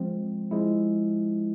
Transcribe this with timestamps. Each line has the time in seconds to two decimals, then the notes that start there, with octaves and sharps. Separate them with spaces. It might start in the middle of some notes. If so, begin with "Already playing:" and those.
Already playing: F3 G#3 C4
0.51 F3 G#3 E4